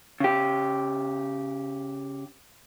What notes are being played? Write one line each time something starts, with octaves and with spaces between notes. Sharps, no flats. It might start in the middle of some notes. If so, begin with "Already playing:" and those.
C#3 G4